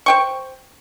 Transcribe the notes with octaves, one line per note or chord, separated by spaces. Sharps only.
C5 G5 C#6